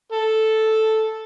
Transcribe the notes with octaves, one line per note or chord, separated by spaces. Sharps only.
A4